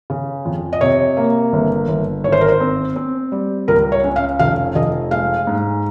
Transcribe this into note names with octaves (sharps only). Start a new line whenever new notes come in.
C#3
F2
D#5
C3 C#5
A#3
G1
G1
G#1 C#5
C5
A#4
C5
C4
C4
G3
C#2 A#4
C#5
C#4
F5
F1 F5
F1 D#5
G#3 F5
G#2